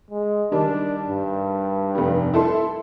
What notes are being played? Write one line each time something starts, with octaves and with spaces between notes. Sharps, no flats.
G#3
D#3 G3 D4
G2
F1 G3
E4 A4 C6